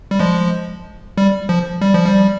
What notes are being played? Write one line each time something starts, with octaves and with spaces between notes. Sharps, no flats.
G3
F3 G#3
G3
F3
G3
F3
G3